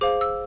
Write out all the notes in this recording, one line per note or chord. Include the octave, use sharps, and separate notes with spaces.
G#4 C5 F5 D6
E6